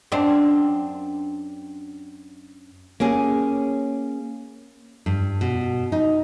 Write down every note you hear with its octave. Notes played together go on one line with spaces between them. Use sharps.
F#2 C4 D4
A#3 C#4 G#4
G2
B2
D#4